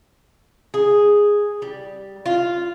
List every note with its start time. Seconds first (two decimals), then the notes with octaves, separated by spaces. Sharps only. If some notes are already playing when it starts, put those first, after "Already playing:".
0.74 G#4
1.62 G3
2.26 F4